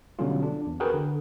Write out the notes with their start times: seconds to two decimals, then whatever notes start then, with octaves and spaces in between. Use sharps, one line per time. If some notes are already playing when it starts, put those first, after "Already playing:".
0.19 B2 D3 F#3 G3 C#4 F4
0.43 D4
0.67 E2
0.80 F#4 G#4 A#4 B4 G5 F#6
0.93 D3